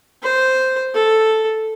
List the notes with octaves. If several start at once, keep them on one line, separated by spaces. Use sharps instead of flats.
C5
A4